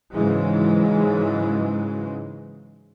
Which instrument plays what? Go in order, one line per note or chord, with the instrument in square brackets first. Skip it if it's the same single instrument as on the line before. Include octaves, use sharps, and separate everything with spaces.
[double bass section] G#2 C#3 E3 F#3 G#3